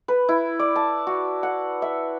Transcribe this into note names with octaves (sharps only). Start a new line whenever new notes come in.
B4
E4
D5
A5
F#4
F#5
E5